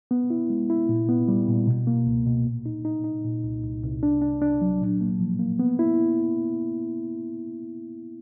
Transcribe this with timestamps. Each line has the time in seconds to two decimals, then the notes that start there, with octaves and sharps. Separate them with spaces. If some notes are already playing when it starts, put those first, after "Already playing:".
0.11 B3
0.30 E4
0.50 G#3
0.70 E4
0.89 A#2
1.09 B3
1.28 G3
1.48 A#2
1.67 B2
1.87 A#3
2.07 C#2
2.26 B2
2.45 A#2
2.66 D#4
2.85 D#4
3.04 D#4
3.24 A#2
3.44 C2
3.64 C2
3.83 C2
4.03 D4
4.22 D4
4.42 D4
4.62 F#3
4.81 A#2
5.01 A#3
5.20 F3
5.39 A#3
5.59 B3
5.79 E4